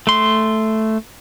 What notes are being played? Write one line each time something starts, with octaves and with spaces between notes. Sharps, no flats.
A3 C6